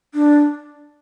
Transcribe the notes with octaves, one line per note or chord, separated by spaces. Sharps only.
D4